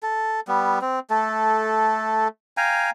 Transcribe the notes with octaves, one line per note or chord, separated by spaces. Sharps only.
A4
G3 B3
C4
A3 A4
F5 G5 G#5 A#5